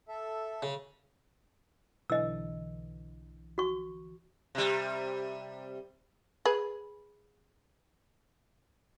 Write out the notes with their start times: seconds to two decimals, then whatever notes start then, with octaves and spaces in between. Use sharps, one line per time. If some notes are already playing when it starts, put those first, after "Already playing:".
0.08 A4 E5
0.63 C#3
2.10 B1 D3 E3 D#5 E6
3.58 F#4 C#6
4.55 C3 G3
6.45 G#4 B4